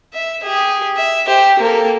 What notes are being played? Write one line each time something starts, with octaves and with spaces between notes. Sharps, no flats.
E5
G4 G#4
E5
G4 C5
A#3 A4